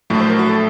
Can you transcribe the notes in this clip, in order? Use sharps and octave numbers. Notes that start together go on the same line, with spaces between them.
A#1 A2 F#3 A3
C5
A#4
F#4
A4